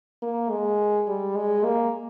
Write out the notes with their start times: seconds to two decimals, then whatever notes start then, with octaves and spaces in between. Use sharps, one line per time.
0.22 A#3
0.50 G#3
1.08 G3
1.36 G#3
1.64 A#3